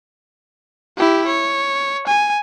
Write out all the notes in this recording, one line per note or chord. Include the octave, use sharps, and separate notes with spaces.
E4 G4
C#5
G#5